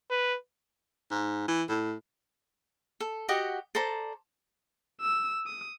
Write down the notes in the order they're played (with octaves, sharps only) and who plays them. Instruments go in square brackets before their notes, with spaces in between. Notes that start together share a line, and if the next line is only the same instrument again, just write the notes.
[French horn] B4
[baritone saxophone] G#2
E3
A2
[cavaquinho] A4
F#4 G4 D#5 F#5
A4 C5 D5 A#5
[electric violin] E6
D#6